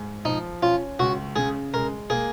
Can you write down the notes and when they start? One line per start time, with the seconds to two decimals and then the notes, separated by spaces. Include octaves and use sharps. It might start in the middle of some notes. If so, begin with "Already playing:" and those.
Already playing: G#2
0.25 F3 D#4
0.62 C#4 F4
0.99 C#2 F#4
1.36 C#3 G#4
1.73 G#3 A#4
2.10 A#3 G#4